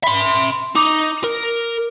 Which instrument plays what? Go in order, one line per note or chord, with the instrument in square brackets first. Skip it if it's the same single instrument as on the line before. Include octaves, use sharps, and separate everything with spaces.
[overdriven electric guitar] E5 C6 [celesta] B5
[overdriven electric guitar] D#4 [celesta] D6
[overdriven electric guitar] A#4